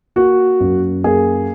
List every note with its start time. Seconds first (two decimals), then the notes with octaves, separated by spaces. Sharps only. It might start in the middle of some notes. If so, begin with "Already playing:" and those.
0.16 A#3 F#4
0.60 F#2
1.04 A#3 G#4